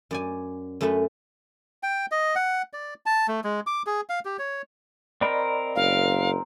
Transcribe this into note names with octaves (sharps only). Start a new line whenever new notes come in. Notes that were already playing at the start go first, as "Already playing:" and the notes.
F#2 D5 G#5
F#2 A3 C#4 A4 B4
G5
D#5
F#5
D5
A5
A3
G#3
D6
G#4
F5
G4
C#5
C4 A#4 D5 D#5 B5
F#1 F5